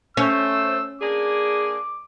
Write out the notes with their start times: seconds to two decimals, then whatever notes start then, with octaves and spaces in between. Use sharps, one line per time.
0.17 A3 C#4 C5 E6
1.01 A#3 D4 G#4 D6